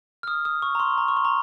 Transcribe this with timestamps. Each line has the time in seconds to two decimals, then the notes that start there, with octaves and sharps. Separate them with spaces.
0.23 F6
0.28 D#6
0.45 D#6
0.62 C#6
0.75 A#5
0.80 C6
0.98 A#5
1.08 C#6
1.17 C6
1.25 A#5